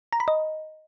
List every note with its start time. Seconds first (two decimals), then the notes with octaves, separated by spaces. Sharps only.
0.13 A#5
0.20 B5
0.28 D#5